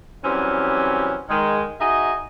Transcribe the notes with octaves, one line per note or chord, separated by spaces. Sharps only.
E3 F#3 G3 C4 C#4
D#3 G#3
D#4 F#4 G#4 D#5 E5 G#5